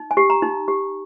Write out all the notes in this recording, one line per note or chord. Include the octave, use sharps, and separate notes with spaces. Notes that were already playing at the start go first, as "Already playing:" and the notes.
Already playing: D#4
G#5
G4
A#5
D#4
G4